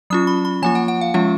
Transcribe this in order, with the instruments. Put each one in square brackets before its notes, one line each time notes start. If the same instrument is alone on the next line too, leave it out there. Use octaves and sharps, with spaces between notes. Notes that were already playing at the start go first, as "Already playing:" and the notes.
[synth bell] F#3 C#4 F4 D#6
B5
B5
F3 A#3 F4 G#5
F#5
F#5
F5
F3 G#3 C#4 F4 F#5